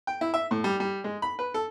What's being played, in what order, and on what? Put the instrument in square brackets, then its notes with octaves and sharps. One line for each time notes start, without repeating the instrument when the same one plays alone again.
[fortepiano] G5
E4
E5
A2
G3
G3
G#3
B5
B4
A4